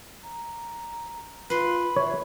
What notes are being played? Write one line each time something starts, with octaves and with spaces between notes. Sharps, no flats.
A#5
F4 B4 C6
C#5 E5